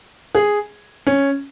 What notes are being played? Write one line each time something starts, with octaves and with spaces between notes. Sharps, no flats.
G#4
C#4